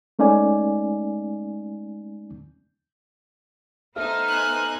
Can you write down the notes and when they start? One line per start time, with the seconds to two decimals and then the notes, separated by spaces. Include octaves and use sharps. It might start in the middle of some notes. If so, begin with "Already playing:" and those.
0.19 G#3 A3 C#4 D#4 D5 G#5
3.96 A3 B3 D#4 A4 C5 E5 F6
4.28 G#5 F#6